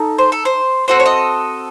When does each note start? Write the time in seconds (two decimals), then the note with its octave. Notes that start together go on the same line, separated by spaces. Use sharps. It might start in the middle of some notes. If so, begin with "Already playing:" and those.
Already playing: D#4 A4
0.18 C5
0.32 A4
0.45 C5
0.88 C4 F#4 A4 C5
1.00 C#5
1.06 D#5